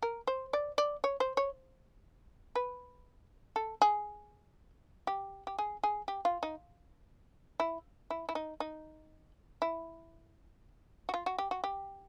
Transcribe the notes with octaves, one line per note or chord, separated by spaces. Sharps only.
A#4
C5
D5
D5
C#5
C5
C#5
B4
A4
G#4
G4
G4
G#4
G#4
G4
F4
D#4
E4
E4
E4
D#4
D#4
E4
F#4
F4
F#4
G4
F#4
G4